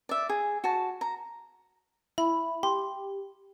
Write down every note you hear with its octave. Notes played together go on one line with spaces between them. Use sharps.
D5 E5
G#4
F#4 A5
A#5
E4 B5
G4 C6